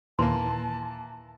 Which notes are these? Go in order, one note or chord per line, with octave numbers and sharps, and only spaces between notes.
D#2 A#2 E3 A#3 A5 C6